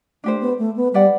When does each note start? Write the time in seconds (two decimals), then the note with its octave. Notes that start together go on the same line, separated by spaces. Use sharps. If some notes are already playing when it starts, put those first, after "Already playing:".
0.24 A3 D4 G4 C5
0.41 B3
0.59 A3
0.76 B3
0.93 G3 B4 D5 F#5